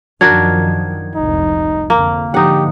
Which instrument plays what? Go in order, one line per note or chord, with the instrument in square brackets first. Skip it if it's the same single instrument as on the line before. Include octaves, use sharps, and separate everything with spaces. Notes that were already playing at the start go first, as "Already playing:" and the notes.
[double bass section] F#2 D#3 F3 [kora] D4 F#4 A#4 [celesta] G#6
[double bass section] F1 C2 G#2 [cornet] D#4
[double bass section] F2 D3 [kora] A#3
[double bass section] G#2 D3 F3 [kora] D#4 F#5 [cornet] G4